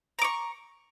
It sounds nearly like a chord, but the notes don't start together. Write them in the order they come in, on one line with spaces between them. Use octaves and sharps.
A#5 D6 C#6